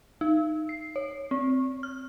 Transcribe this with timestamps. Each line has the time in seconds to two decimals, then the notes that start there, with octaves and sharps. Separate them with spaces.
0.21 D#4
0.69 C7
0.96 C#5
1.31 C4
1.83 F6